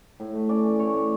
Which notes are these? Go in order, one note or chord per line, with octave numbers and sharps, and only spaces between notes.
A2
A3
C#4 D5
E3
A2 C#5
A3